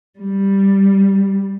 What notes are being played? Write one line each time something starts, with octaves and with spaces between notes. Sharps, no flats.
G3